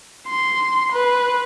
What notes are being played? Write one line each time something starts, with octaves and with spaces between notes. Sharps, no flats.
C6
B4